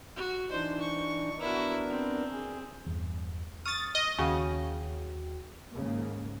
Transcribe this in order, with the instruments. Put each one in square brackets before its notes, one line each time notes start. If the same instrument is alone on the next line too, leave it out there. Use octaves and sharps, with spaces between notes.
[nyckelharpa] F#4
[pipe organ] E3 D4 D#4 [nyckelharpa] C5
[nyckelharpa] C#6
[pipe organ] B3 D4 A#4 [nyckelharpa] E4 F#4
[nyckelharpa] C4
[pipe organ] G#4
[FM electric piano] E2 G2
[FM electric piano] C#6 F6 [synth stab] D#6 A6
[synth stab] D#5
[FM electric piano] D#2 F#4 G5 [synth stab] C#3
[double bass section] D#2 G#2 C#3 A#3